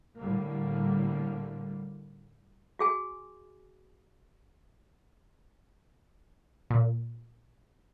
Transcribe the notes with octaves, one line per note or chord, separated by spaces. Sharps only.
A2 D3 G3 A#3
F#4 G#4 G#5
A#2